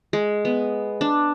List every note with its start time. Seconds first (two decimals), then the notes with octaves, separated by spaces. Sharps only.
0.13 G#3
0.45 B3
1.01 D4